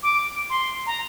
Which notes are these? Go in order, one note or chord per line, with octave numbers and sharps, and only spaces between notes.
D6
C6
A#5